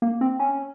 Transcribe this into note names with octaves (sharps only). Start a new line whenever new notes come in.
A#3
C4
C#4